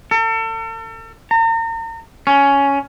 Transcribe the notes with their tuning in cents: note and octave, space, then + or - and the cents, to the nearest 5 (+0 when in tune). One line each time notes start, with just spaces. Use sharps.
A4 +40
A#5 -40
C#4 +10